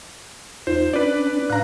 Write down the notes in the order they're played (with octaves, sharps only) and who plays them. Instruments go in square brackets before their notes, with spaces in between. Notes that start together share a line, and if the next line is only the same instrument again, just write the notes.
[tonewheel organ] E2 D#4 F4 [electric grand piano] C5
[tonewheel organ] C#4 D4 [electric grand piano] B4 D5
[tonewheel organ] A2 D4 F5 [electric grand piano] A#5 F#6